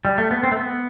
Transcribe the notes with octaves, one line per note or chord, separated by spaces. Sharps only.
G3
A3
B3
C4
A3
B3